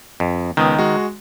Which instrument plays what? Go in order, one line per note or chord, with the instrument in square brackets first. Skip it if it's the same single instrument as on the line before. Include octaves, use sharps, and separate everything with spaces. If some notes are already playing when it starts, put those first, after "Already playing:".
[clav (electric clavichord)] F2
[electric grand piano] C#2 B3 D#6 [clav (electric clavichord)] D#3
[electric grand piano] G#3 F#4